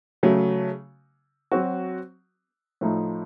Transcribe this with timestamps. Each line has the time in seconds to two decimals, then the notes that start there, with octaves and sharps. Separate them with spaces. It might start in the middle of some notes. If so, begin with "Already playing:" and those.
0.23 C#3 F#3 A3
1.52 F#3 C4 F#4
2.81 A2 F3 A3 D#4